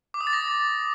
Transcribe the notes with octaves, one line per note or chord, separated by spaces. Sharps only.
D6
D#6
A6
A#6